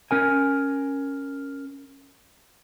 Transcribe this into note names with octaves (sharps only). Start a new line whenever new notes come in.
C#4 A#4 G#5